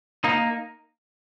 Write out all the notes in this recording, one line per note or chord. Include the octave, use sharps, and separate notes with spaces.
A#3 D#4